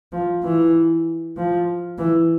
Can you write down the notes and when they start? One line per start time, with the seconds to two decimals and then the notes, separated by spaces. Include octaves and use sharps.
0.12 F3
0.43 E3
1.37 F3
1.98 E3